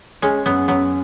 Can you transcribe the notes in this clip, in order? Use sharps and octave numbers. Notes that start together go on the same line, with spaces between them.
G#3 C#4 G#4
F#2 F#3 B3
F#2 F#3 B3